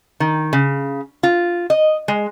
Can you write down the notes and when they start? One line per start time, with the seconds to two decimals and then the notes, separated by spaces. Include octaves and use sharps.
0.20 D#3
0.53 C#3
1.23 F4
1.70 D#5
2.08 G#3